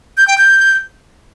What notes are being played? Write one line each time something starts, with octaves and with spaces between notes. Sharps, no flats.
G6
G5
G6